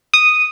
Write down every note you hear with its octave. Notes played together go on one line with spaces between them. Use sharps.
D#6